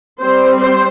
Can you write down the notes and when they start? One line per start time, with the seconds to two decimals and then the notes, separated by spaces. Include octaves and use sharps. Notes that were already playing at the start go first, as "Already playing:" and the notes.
0.21 G3 C4 C5
0.60 C5